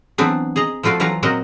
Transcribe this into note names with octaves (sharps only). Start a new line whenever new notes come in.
E3 F#3 B3 C4 D4
G#4 D#5 A#5
F3 A3 F4 F#4 D5
E3 F#3 F4 B4 C#5 A#5
A#2 F#3 C4 F#4 A#4 D#5